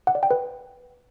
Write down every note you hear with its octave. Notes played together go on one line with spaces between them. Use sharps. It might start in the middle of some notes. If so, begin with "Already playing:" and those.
F#5
D5
G5
B4